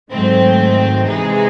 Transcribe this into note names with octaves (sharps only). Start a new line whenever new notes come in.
G#2 D#3 F#3 A3 C4
C3 E3 G#3 D#4 G#4